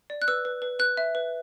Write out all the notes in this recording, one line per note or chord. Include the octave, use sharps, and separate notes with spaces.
D5
F#6
B4 E6
B4
B4
B4 F#6
E5
B4